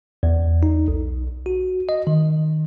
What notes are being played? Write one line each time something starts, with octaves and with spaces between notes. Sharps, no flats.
E2
D#4
B1
F#4
D#5
D#3